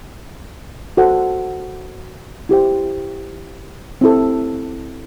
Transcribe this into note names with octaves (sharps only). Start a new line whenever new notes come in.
F#4 A4 C5 F#5
E4 G4 C5 G5
C4 E4 A4